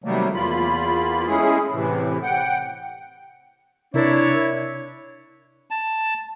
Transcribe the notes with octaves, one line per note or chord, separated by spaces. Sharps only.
C3 D#3 F#3 G3 A3 A#3
E2 A#3 F4 B5
G#3 A3 C#4 E4 G#4
A2 C3 E3
F#5 G5
C3 D4 E4 A#4 C#5
A5